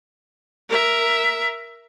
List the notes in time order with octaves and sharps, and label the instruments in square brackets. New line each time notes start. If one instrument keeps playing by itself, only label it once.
[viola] A#4 E5